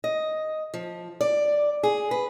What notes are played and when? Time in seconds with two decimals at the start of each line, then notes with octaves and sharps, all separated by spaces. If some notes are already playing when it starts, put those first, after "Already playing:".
0.04 D#5
0.74 F3
1.21 D5
1.83 G#4
2.11 B4